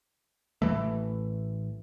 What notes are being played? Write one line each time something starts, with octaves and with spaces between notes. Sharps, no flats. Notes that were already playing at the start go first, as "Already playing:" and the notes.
A1 D#3 E3 A3